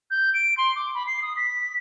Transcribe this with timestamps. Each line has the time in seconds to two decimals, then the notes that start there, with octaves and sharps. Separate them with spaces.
0.11 G6
0.34 D7
0.57 C6
0.76 D6
0.95 B5
1.07 C7
1.22 D#6
1.37 B6